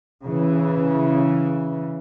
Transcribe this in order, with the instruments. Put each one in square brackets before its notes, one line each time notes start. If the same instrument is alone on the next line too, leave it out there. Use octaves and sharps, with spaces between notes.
[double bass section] C#3 E3